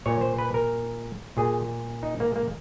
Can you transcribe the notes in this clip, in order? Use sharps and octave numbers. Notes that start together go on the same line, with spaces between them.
A#2 C#5
C5
B4
A#4
A#2 G#4
D#4
A#3
A#3